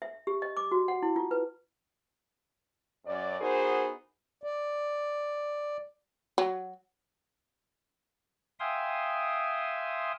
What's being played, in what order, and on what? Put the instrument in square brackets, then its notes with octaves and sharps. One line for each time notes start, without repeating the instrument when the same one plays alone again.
[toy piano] E5
G4
D#5
D6
F#4
F#5
E4
F4
B4
[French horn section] F#2 D5
B3 D#4 F#4 G#4 A#4 C5
[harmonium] D5
[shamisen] F#3
[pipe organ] E5 F5 G5 G#5 C6 D#6